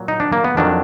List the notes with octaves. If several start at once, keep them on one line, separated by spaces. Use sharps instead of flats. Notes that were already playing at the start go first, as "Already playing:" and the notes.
Already playing: A#2 F#3
D#4
D4
A#3
B3
F2 D#3 F#3 D4